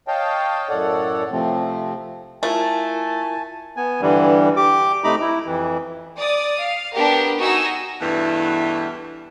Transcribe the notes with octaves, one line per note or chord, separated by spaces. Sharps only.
C#5 D#5 F5 G5 A5
F#2 A2 A4 C#5 D5 F#5
C3 F3 A3 C4
A3 E4 F4 A#4 G#5 A5
B3 G#5
G2 D3 E3 G3
G4 D6
C3 A3 D#4 A#5 B5 D6
E4
F2 E3
D5 D#6
F5
B3 D4 G4 A#4
D#4 F#4 G#5 E6 A#6
E2 G2 B2 E3 G3 A3